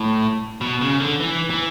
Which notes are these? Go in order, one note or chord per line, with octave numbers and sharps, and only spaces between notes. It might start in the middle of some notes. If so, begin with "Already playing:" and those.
Already playing: A2
B2
C#3
D3
E3
E3